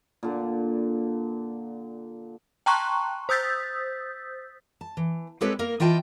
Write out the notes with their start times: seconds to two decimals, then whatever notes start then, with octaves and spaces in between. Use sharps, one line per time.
0.23 A#2 D3
2.66 G5 A5 A#5 C6 C#6 F#6
3.29 C5 D#6 E6 G6 A6 B6
4.81 A5
4.97 E3
5.41 G#3 C4 G4 A4 B4 C#5
5.59 A#3 A#4
5.80 E3 F4 D#5 G5 A5